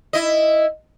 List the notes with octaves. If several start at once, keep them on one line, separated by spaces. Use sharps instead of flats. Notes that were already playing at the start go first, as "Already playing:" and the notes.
E4 D#5